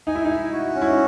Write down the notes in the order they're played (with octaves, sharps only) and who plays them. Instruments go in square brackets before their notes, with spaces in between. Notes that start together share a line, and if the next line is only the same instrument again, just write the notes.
[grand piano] D#4 [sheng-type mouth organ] G#5
[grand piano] E4
D#4
[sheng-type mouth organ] E4
F#4
C#4
[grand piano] E4
D#4